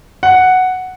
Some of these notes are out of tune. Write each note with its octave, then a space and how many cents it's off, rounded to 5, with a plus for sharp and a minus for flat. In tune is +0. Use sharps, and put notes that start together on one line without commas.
F#5 +0